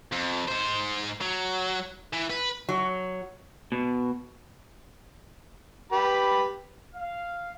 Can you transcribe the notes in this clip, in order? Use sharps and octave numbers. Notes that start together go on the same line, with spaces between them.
F2
G#2 C5
F#3
E3
B4
F#3
B2
G4 B4 B5
F5